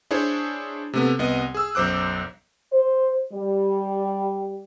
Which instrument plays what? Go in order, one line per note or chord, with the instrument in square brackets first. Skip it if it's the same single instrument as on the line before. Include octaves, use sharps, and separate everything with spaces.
[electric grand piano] D4 E4 G#4 C5 C#5
C3 A3 B3
C2 B3 D#5
G#4 E6
B1 F#2 C5 D6 F#6
[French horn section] C5
G3